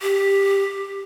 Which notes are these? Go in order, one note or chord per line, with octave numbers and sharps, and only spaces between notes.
G4